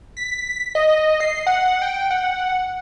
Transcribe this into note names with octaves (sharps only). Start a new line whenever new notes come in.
B6
D#5
C7
F#5
G5
F#5